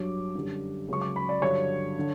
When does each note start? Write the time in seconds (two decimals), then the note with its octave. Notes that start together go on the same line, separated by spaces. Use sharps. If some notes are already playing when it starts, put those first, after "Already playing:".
Already playing: G2 F#3 D6
0.35 F#2 D3 G3
0.88 C#2 C#3 F#3 C#6
1.01 D6
1.16 B5
1.29 D5
1.42 G2 D3 F#3 C#5
1.98 D3